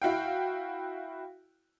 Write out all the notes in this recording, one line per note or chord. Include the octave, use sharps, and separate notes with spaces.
E4 F#4 F5 G5